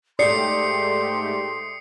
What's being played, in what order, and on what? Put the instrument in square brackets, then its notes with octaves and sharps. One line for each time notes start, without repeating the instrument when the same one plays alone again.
[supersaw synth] G#2 A3 G4 [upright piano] D5 [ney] C6 [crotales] D#6 C7 C#7